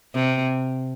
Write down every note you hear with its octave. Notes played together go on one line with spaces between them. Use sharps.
C3